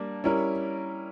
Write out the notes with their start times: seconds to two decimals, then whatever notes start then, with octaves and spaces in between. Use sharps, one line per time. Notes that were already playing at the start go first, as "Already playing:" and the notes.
Already playing: G3 A#3 D4
0.24 G3 C#4 E4 A#4